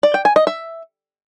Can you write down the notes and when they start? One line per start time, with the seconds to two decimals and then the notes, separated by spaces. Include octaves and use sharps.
0.03 D5
0.14 G5
0.25 G#5
0.36 D#5
0.47 E5